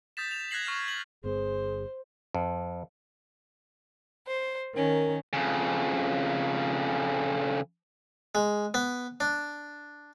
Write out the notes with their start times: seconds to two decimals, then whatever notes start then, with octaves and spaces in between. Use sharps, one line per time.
0.17 D#6 G6 A6 B6 E7
0.31 E7 F7
0.51 F#6 G#6 A#6 C7 F#7
0.65 C#6 F6 C7 E7
0.88 F#7
1.24 G1 G2 B3 G#4 C5
2.35 F2
4.27 C5
4.75 D#3 C#4 A#4
5.33 F2 C#3
8.35 G#3
8.74 B3
9.20 D4